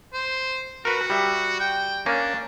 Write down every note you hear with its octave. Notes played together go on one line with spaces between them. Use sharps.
C5
F#4 A#4 B4
G3 E5
G5
A#3 C#4 D4